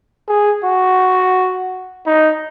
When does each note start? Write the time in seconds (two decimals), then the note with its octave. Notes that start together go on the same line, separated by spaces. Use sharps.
0.28 G#4
0.64 F#4
2.06 D#4